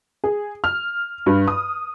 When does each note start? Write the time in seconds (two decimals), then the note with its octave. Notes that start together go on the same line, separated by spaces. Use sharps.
0.24 G#4
0.64 F6
1.26 G2
1.48 D#6